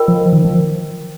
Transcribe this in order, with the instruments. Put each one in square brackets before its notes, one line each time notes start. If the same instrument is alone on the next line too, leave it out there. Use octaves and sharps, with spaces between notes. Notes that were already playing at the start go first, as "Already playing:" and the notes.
Already playing: [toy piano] F4 A#4 D#5 G5
[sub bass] F3
D#3
F3